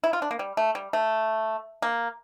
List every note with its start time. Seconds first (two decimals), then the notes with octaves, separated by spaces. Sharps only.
0.04 E4
0.13 F4
0.22 D4
0.31 A#3
0.39 G3
0.57 A3
0.75 G3
0.93 A3
1.82 A#3